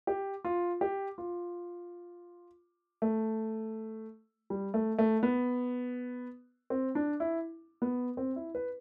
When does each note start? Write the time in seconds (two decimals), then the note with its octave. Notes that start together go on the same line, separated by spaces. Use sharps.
0.07 G4
0.45 F4
0.81 G4
1.18 F4
3.02 A3
4.50 G3
4.74 A3
4.99 A3
5.23 B3
6.70 C4
6.95 D4
7.20 E4
7.82 B3
8.17 C4
8.36 E4
8.55 B4